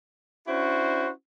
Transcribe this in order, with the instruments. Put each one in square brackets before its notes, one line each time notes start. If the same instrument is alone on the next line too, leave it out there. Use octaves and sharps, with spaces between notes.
[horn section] C#4 D4 E4 F#4 C5